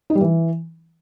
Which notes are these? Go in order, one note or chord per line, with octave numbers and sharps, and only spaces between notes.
D#4
G3
E3